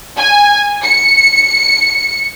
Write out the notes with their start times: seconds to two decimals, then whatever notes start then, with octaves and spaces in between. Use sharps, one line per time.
0.17 G#5
0.82 C#7